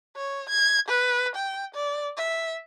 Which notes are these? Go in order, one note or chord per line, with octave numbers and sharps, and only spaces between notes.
C#5
G#6
B4
G5
D5
E5